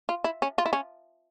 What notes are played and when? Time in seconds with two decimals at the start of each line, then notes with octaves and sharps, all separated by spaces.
0.09 F4
0.24 E4
0.42 C#4
0.58 F4
0.66 E4
0.73 C#4